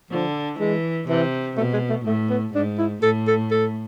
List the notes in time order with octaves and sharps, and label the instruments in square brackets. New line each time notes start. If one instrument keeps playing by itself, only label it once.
[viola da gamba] D3 [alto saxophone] F3
[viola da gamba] E3 [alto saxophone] G#3
[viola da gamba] C3 [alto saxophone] E3
[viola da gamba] B2 [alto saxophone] A3
[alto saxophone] G#3
A3
[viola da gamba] A2 [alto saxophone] A3
[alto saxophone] B3
[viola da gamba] G#2 [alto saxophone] D4
[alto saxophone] E4
[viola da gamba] A2 [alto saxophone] A4
[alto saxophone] A4
A4